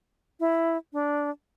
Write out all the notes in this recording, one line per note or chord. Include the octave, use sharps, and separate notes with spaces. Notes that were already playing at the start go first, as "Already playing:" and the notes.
E4
D4